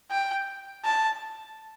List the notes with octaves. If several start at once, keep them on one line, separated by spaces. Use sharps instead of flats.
G5
A5